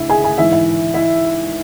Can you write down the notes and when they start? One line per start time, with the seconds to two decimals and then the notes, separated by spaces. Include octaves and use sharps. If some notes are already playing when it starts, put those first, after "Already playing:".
Already playing: D2 C#3 E4 E5
0.10 G#4 G#5
0.24 G#4 G#5
0.38 G#2 E3 E4 E5
0.52 E4 E5
0.94 E4 E5